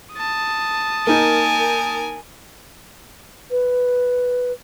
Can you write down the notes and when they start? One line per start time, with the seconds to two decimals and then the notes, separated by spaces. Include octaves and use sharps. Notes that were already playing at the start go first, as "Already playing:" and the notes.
0.14 A5 D#6
1.07 A#3 D#4 A#4 G#5
3.51 B4